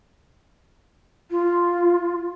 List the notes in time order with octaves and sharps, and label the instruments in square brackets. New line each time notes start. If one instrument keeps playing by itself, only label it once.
[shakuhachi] F4